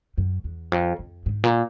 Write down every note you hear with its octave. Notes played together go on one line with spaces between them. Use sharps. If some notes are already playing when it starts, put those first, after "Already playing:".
F#2
E2
F2
F2
G#2
A#2